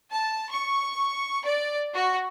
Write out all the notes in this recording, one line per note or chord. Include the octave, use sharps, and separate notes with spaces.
A5
C#6
D5
F#4